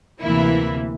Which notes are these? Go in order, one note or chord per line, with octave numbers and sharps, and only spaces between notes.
D2 C3 E3 A#3 E4